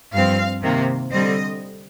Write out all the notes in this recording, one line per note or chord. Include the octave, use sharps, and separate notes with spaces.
G2 F3 C4 F5
C3 D#3 A#3
D3 G3 C4 D#5